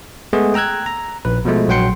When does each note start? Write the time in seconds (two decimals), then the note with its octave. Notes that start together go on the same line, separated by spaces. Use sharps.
0.33 G#3 A3 B3 G#4
0.54 G5 A#5 E6 F#6 G#6
0.86 A#5
1.25 A#1 B4
1.45 B2 F3 G#3 A3
1.68 A#1 F#3 F#5 G5 C6 C#7